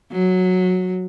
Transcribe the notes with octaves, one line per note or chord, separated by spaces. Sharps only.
F#3